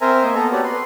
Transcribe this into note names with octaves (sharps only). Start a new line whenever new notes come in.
C4 A#4 C5 E5 G#5 A#5
A#3 D#5
B3 A4 A#5
F#4 G4 B4 C#5 D5
B4 C6